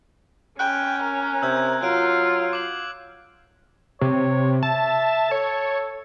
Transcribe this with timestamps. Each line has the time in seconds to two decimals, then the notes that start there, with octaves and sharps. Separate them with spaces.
0.59 C#4 G5 F#6
1.03 A#4
1.42 C3 E6 G6 G#6
1.83 F#3 F4 F#6 D7
2.53 D6 F#7
4.01 C3 C#5
4.63 E5 A5
5.31 A4 C#5